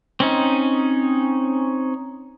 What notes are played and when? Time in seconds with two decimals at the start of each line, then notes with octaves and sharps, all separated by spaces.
0.20 C4 C#4 D#4